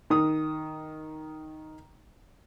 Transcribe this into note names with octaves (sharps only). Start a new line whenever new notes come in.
D#3 D#6